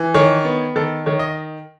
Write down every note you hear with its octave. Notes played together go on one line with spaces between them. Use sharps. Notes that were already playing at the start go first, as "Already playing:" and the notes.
Already playing: E3
D#3 C#5
B3
D#3 A4
D#3 C#5
D#5